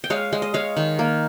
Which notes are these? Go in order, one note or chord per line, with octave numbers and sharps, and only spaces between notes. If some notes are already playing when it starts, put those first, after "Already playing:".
G5
G#3 C#5 F5
G#3
D#5
G#3 C#5 F5
D#3
A#3